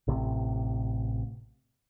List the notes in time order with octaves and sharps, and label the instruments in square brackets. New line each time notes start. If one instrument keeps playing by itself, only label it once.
[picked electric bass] A1 C3